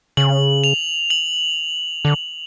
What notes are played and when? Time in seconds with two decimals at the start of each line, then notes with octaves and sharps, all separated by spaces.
0.17 C#3 F#7
0.64 F7
1.10 F#7
2.05 D3